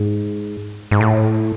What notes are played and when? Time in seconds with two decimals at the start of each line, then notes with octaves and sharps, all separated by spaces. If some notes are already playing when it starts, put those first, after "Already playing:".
Already playing: G#2
0.91 G#2
1.01 A2